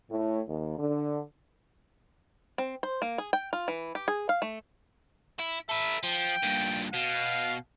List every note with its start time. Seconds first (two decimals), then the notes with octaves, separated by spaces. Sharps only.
0.10 A2
0.48 D#2
0.78 D3
2.58 C4
2.83 C5
3.02 A#3
3.18 G#4
3.33 G5
3.53 F4
3.68 E3
3.95 G4
4.08 G#4
4.29 F5
4.42 A3
5.39 E4
5.69 A4 B4 E5
6.03 F3 G5
6.43 G2 A#2
6.94 B2 F5